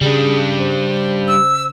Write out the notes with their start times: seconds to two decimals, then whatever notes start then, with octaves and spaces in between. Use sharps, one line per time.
0.01 C#3 G3 D4 G#4
0.59 C5
1.28 E6